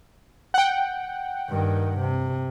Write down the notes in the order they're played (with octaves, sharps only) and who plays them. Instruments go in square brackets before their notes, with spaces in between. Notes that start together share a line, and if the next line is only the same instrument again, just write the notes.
[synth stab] F#5 G5
[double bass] G2 D#3
C3